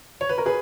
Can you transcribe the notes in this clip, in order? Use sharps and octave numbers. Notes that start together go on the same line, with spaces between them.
C#5
B4
A#4
G#4 B4